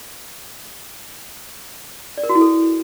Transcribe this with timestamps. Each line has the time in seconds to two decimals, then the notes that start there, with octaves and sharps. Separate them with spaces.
2.18 D5
2.23 A#4
2.29 F#4
2.35 E4
2.41 A4